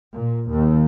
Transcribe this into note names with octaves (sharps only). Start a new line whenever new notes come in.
A#2
D#2